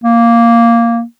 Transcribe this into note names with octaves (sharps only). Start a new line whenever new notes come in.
A#3